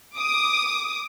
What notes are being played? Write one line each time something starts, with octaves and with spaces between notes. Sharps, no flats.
D6 D#6